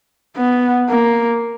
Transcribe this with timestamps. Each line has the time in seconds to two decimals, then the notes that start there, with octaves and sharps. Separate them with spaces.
0.37 B3
0.89 A#3